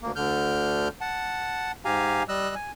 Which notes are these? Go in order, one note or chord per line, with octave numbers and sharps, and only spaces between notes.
D2 A#3
D2 D3 F6 G6
F#5 A5
G#2 G4 F5 G#5 A#5
G3 D#5 E6 F#6
G#5